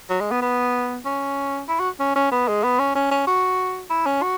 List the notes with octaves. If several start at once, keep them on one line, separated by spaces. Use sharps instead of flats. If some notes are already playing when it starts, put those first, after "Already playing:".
F#3
G#3
B3
B3
C#4
E4
F#4
C#4
C#4
B3
G#3
B3
C#4
C#4
C#4
F#4
E4
C#4
F#4